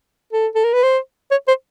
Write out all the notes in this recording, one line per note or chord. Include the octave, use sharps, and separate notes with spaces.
A4
A4
A#4
B4
C5
C#5
C5